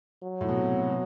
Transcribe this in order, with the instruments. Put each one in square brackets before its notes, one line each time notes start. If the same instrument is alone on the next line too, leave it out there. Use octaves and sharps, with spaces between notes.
[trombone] F#3
[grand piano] A2
B2
C3
B2